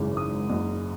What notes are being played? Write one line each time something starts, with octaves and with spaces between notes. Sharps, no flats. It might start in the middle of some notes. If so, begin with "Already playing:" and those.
Already playing: G#1 F#2 C#3 E3
D#6
F#1 F#2 C#3